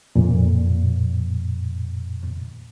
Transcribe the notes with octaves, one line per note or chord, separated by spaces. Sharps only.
F2 A#2